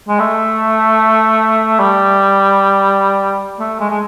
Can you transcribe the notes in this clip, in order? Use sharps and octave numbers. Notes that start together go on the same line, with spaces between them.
G#3
A3
G3
A3
G#3
G#3